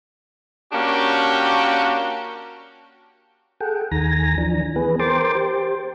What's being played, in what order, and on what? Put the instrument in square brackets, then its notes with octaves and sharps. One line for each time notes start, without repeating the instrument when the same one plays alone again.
[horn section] A#3 C#4 D4 F#4 G4
[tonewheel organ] G#4 A4 F#5 G5
D#2 D#3 G#5 A#5 A#6
E3 F3 D4
E3 B3 G#4 B4
A#4 C5 G5 C6 D6 A6
G4 C5